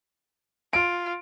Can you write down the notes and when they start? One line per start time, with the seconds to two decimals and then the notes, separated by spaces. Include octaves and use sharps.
0.73 F4 D7